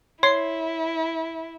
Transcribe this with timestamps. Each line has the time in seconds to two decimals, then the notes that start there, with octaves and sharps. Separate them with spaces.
0.23 E4 C#5 C6